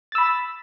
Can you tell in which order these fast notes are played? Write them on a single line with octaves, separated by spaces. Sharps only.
A6 E6 B5